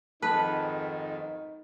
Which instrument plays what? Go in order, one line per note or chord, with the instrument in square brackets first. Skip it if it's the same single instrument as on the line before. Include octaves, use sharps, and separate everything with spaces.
[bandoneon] F2 G#2 D#3 [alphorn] D#4 [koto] B4 [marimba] A5